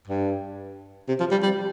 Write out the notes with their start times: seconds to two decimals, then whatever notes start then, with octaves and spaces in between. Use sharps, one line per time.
0.08 G2
1.08 C3
1.20 F3
1.31 G3
1.42 G3